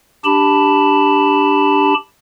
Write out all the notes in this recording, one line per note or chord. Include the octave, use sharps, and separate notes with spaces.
D4 G4 A5 B5